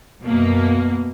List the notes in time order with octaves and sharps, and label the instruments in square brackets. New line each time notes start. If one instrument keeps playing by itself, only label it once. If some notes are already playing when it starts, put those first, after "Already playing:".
[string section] F#2 B2 A#3